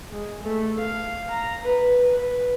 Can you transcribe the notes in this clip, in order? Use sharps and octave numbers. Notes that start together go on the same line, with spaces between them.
G#3
A3
F5
A#5
B4
B4